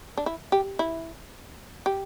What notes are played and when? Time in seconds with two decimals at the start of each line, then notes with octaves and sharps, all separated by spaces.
0.17 D4
0.26 E4
0.52 G4
0.79 E4
1.86 G4